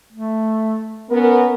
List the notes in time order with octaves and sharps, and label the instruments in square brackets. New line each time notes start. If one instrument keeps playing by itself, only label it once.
[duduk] A3
[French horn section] B3 A#4 [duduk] C#4